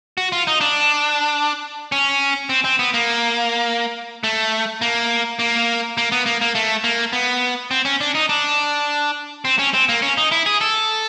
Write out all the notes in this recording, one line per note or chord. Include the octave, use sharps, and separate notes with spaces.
F#4
F4
D#4
D4
C#4
C4
C4
B3
A#3
A3
A#3
A#3
A#3
B3
A#3
A#3
A3
A#3
B3
C4
C#4
D4
D#4
D4
C4
C#4
C4
A#3
C#4
D#4
E4
G#4
A4